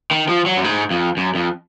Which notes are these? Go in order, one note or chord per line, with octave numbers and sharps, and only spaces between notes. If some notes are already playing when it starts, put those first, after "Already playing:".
D#3
F3
F#3
F#2
G#2
F2
F#2
F2